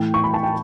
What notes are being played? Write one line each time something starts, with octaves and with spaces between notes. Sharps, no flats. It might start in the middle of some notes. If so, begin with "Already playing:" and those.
Already playing: A2 E3 A3 G5
C#6
B5
A5
G5